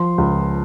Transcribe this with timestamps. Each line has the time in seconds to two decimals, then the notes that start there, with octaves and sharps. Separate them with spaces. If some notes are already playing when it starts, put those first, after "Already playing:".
Already playing: F3 C6
0.18 C#2